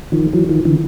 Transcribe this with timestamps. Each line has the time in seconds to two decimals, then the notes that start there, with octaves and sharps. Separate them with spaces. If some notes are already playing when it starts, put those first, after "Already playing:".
0.12 D#3 F3
0.33 E3 F#3
0.49 D#3 F3
0.65 D3 E3